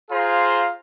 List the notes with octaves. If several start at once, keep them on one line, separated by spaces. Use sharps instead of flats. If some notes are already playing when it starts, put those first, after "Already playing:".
F4 G#4 C5 F5 A#5 C6